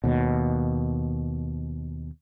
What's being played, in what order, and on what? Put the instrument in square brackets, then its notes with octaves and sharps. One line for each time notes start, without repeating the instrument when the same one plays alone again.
[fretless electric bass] D#2 B2